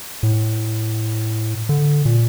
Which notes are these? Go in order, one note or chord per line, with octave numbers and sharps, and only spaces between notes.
A2
D3
A#2